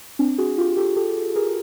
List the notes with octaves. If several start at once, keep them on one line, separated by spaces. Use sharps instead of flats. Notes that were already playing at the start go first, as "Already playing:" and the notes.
C4 D4
F#4 G#4
F4 G4
G4 A4
G4 A4
G#4 A#4